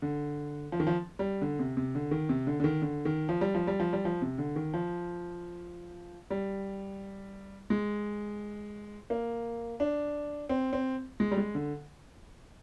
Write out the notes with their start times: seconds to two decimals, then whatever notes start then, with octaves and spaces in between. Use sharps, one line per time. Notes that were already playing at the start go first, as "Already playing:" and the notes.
0.02 D3
0.72 F3
0.80 D#3
0.87 F3
1.19 G3
1.42 D3
1.59 C3
1.77 C3
1.95 D3
2.11 D#3
2.29 C3
2.47 D3
2.60 D3
2.64 D#3
2.82 D3
3.05 D#3
3.29 F3
3.41 G3
3.54 F3
3.67 G3
3.80 F3
3.93 G3
4.05 F3
4.22 C3
4.38 D3
4.56 D#3
4.74 F3
6.30 G3
7.70 G#3
9.10 A#3
9.80 D4
10.49 C4
10.73 C4
11.20 G#3
11.31 G3
11.37 G#3
11.55 D3